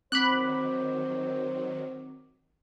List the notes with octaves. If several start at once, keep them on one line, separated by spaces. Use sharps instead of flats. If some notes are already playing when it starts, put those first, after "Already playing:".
D#3 F#3 C4 C5 B5 D6 F#6